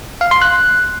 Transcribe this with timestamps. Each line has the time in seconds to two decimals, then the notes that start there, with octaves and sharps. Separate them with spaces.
0.21 F5
0.31 C6
0.42 F#6